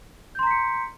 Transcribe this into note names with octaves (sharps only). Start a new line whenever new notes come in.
A#5 C6 G6 B6 C#7